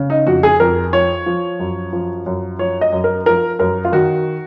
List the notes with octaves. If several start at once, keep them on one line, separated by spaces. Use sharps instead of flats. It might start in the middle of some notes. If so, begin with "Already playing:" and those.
Already playing: C#3
D#4
F2 F#4
G#4
F2 A#4
F3 C#5
F3
F#2
F3
F#2
F3 C#5
D#5
F#2
A#4
F3 A#4
F#2 A#4
F4
D#3 F#4